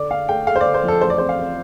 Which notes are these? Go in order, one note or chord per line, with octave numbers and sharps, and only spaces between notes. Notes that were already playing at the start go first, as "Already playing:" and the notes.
Already playing: D3 D5
D3 F5
A3 G5
A3 F5
C5
D5
D3
C5
F2 A4
A1 C5
D5
C4 C5
F5
C4